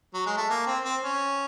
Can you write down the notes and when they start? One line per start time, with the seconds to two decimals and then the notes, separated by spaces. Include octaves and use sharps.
0.14 F#3
0.26 G#3
0.37 A3
0.50 A#3
0.66 C4
0.84 C4
1.03 C#4